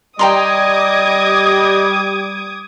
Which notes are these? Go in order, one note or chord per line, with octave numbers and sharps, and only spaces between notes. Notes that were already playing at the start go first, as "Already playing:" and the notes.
G3 D#5 G5 A#5 C6 D6 D#6 G#6